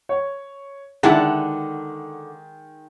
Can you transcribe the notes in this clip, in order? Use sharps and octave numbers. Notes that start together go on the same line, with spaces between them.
C#5
D3 D#3 G#3 D4 E4 F#5 A5